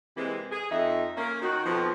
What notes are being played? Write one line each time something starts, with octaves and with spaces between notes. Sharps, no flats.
C3 E3 G#3 A#3 C4 B4
G#4
F2 D#4 E5
A#3 C#4
D#3 D#4 F#4
F2 B2 D#3 F3